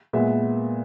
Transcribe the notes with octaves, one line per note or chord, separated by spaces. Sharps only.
A#2 G#3 B3 E5